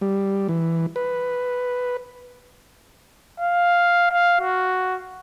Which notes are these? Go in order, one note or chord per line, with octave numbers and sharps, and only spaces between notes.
G3
E3
B4
F5
F5
F#4